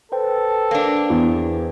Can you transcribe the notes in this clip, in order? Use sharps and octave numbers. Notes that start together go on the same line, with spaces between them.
A4 B4 C5 G5
A#3 D4
E2